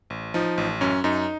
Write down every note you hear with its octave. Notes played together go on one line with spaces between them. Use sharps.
A1
F3 D#4
A1
F#2 C#4
F#2 D#4